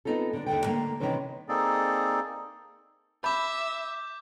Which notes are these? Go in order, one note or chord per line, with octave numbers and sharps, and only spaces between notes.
B3 C4 D#4 F4 A4
D3 D4
D#2 G#2 D3 G5
D3 A3 A#3
C3 D#3 E3 C#4 C5
A#3 C4 D#4 G#4 A4 D5
E5 B5 D6 G6